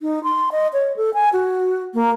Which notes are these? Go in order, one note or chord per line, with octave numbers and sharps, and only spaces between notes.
D#4
C6
D#5
C#5
A4
G#5
F#4
A#3